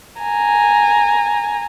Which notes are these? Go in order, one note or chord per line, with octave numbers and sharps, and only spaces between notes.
G#5 A#5